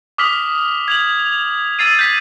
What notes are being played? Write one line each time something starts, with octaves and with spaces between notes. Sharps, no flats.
D6 D#6 F6 B6 F#7
G#6 F7 F#7
E6 A6 C7 D#7
G6 B6